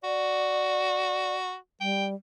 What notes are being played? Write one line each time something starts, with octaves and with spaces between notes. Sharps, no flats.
F#4 D5
G3 G5